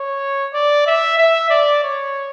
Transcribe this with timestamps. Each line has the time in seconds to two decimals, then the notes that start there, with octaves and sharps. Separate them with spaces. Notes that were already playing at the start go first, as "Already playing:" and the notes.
Already playing: C#5
0.54 D5
0.87 E5
1.18 E5
1.50 D5
1.83 C#5